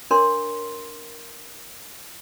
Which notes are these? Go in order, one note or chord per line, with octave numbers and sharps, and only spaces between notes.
D4 A#4 C#5 C6